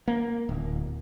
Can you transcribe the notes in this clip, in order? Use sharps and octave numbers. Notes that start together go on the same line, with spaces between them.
A#3
D1